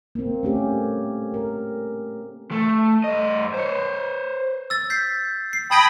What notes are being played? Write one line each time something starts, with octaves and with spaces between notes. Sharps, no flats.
A#3 C4
A3 C#4 G4
A#4
A3
G2 D#5
C5 C#5
E6 A6
G6 B6 C7
C7
G5 A5 B5 D#6 G#6 A#6